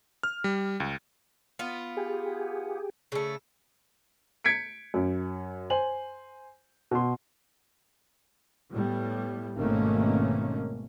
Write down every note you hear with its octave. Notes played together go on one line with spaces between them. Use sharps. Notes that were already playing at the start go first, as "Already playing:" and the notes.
F6
G3
C#2
B3 F4
G4 G#4
C#3 A3
G#6 B6 C#7 D7
F#2
C5 G#5 F#7
B2 C6
A2 G3 B3
G#1 B2 D#3 A3 A#3 C#4